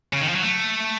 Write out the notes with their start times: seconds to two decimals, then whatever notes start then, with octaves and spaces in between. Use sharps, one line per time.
0.13 C#3
0.21 D#3
0.29 F3
0.35 F#3
0.43 A3